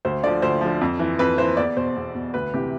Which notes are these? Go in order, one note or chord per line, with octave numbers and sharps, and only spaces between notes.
D2 C5
D3 F3 D5
D2 C5
D3 F3
F2
E3
F2 B4
E3 C5
E2 D5
B2 C5
E2
B2
D2 B4
C3 E3 G4